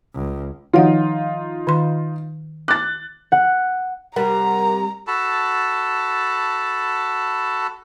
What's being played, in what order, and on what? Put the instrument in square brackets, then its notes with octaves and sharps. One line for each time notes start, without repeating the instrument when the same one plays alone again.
[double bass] C#2
[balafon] D#3 F3 F#5 [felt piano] D#4 F4
[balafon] D#3 C6
[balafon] D6 [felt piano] F#6 A6
[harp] F#5
[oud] C3 G3 [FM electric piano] A#4 F#5 [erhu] A#5
[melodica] F#4 A4 A5 B5